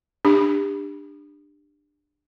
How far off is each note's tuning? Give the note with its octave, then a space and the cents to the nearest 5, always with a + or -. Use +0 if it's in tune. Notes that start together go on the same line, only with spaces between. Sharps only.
D4 +20 G4 +30